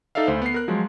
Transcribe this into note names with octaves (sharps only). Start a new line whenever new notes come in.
D#4 A4 D5 E5 F5
D2 C5
B3 C7
A#4 F#6
F3 F#3 G#3